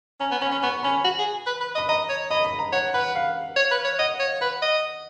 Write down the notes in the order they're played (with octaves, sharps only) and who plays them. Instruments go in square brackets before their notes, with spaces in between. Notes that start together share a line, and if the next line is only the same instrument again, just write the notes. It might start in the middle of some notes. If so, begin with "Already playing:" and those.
[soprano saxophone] C#4 [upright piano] A#5
[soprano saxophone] B3
[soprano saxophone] C#4 [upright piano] B5
[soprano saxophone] C#4
[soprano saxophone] B3 [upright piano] C#6
[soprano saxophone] C#4 [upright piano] B5
[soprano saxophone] F#4
G#4
B4
B4
D#5
[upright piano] B5
[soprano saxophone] D#5 [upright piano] A#5
[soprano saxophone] C#5
[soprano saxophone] D#5 [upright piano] B5
[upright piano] B5
A#5
[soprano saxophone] C#5 [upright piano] F#5
[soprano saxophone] B4 [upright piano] F#5
[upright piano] F5
[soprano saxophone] C#5
B4
C#5
[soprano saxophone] D#5 [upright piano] F#5
[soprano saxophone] C#5
[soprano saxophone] B4 [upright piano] F#5
[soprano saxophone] D#5